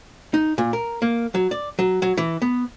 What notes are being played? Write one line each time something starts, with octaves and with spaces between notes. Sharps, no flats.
D#4
A#2
A#4
A#3
F#3
D5
F#3
F#3
E3
B3